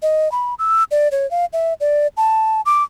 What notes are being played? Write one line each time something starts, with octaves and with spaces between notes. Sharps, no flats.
D#5
B5
E6
D5
C#5
F5
E5
D5
A5
D6